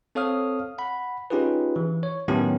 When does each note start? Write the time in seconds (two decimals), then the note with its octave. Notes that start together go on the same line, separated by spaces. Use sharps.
0.15 C4 A4 C#5 F5 D#6 F6
0.78 F#5 B5
1.30 C#4 D#4 F4 G4 G#4 B4
1.76 E3
2.03 C#5
2.28 A2 D#3 F#3 B3 C#4 G4